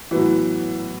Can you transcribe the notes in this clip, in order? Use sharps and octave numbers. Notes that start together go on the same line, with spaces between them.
A2 E3 F#3 B3 F#4 B4